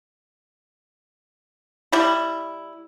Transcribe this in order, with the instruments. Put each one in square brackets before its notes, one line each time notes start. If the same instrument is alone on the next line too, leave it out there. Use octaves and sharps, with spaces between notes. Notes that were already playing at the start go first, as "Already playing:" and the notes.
[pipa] G3 E4